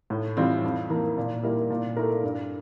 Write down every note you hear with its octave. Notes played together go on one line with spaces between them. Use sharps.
A2
E3 G3 C4 F4
F2
E3 A#3
A#2
G3 A#3 E4 A#4
A#2
A3 E4 A#4
G2